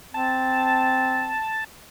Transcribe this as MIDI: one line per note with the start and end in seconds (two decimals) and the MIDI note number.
0.14 1.36 60
0.14 1.64 81